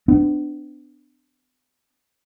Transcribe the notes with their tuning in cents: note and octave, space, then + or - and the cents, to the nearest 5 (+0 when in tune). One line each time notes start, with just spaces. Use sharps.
B3 +40 D4 +10